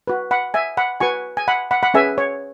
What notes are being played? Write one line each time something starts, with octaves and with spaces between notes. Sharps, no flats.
F#4 B4
F#5 B5
E5 G#5
F#5 B5
F#4 B4 G#5 C#6
G#5
F#5 B5
F#5 B5
F#5 B5
C#4 G#4 B4 E5 G#5
C#5